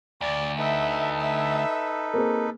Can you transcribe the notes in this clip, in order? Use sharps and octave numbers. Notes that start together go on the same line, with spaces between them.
D2 D5
D#4 A4 B4 E5
E5
A#3 C4 G#4